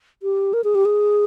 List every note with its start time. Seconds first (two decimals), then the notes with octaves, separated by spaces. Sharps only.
0.23 G4
0.53 A#4
0.64 G#4
0.75 G4
0.85 G#4